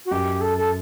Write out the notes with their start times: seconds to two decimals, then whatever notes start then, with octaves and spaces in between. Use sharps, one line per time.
0.06 F#4
0.11 F#2 G4
0.41 A4
0.58 A4